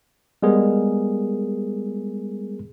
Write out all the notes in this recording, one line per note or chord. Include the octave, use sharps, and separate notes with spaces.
G3 G#3 B3 G#4 A#4